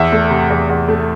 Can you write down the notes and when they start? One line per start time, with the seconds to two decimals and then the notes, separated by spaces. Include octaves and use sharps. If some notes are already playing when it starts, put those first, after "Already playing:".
Already playing: E2 E5
0.12 A3
0.30 C3
0.50 E2
0.70 E2
0.88 A3